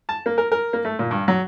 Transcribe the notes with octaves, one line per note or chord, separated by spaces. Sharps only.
A5
A#3
A#4
A#4
A#3
A3
A#2
G2
F#3